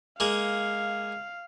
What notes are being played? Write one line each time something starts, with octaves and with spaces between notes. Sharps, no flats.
G#3 A#3 G#4 F5